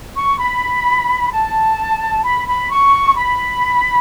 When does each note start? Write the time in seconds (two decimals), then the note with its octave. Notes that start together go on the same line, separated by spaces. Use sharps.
0.15 C#6
0.38 B5
1.31 A5
2.23 B5
2.46 B5
2.69 C#6
3.15 B5